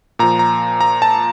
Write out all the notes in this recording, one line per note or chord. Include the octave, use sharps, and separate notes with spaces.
A#2 F3 A#5
A#5
A#5
A5